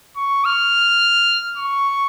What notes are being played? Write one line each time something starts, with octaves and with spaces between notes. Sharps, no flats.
C#6
F6
C#6